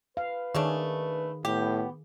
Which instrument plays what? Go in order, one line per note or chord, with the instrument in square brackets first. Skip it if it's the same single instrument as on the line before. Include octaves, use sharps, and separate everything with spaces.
[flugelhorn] B4 [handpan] F5
[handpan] D#3 G#4 [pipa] A3 C#4 D4
[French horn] A2 [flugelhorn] B3 [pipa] G4